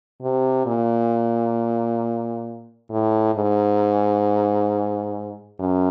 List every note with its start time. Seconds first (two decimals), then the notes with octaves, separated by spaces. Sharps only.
0.22 C3
0.66 A#2
2.90 A2
3.35 G#2
5.59 F#2